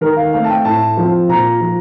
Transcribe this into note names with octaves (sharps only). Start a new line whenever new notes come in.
D#3 A#4
F5
A3 C4 F5
A5
G5
A2 A5
F3 C4
A#2 A#5
F3